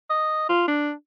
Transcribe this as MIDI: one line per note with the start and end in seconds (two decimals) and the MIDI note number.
0.10 0.48 75
0.49 0.64 65
0.68 0.92 62